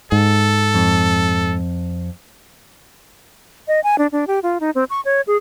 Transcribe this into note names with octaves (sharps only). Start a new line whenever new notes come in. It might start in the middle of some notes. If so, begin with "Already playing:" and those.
G#2 A4
F2
D#5
G#5
D4
D4
G4
F4
D#4
C4
C#6
C#5
G#4